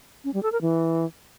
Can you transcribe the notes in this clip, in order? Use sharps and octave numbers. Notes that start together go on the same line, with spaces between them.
C#4
G3
A4
A#4
E3